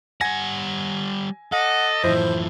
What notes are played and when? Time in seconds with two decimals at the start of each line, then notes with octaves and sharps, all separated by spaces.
0.21 G3 F#5 G#5 G#6 A#6
1.52 A4 D#5 F#5
2.04 F#2 A2 E3 F3 E4 C5